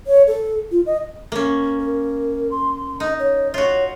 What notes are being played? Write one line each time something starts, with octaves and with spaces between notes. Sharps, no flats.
C#5
A4
F4
D#5
A#3 C#4
A#4
C6
D#4 D#5
C#5
F4 F#4 C#5